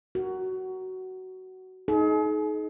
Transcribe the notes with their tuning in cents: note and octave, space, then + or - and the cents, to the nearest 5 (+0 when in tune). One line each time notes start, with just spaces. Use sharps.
F#4 +15 A#4 +0
D#4 +10 G#4 +40